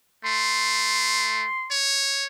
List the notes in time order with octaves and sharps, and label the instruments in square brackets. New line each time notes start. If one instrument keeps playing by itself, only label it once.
[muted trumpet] A3 [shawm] C6
[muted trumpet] C#5